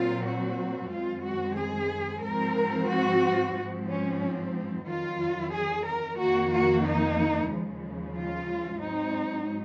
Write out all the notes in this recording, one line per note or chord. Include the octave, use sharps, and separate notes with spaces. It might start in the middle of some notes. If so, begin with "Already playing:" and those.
Already playing: A#2 F#3 C4 F4
F#4
F#2 D#3 G#3 C4 F4
F#4
G#4
G#2 F3 C4 A#4
F#4
G#2 F3 C4
C#4
F2 D#3 F#3 F4
G#4
A#4
F2 D#3 A#3 F#4
F#4
D#4
D#2 C#3 F3 G#3
F4
G#2 F#3 C4 D#4